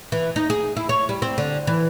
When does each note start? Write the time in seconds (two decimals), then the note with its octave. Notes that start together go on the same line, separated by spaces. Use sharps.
0.12 E3
0.36 D#4
0.50 G#4
0.77 E4
0.89 C#5
1.09 G3
1.22 C4
1.38 D3
1.67 E3